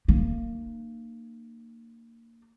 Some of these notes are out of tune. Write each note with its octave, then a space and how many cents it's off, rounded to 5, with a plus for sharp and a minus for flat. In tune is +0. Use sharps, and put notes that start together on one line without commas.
A#3 -20 D4 +45